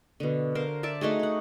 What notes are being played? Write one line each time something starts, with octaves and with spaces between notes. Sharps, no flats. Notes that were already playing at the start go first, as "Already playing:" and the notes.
B2 D3
A#4 C5 F5
D5 E5 A5 D6
A3 D#4 F#4 G#4
C#5 F#5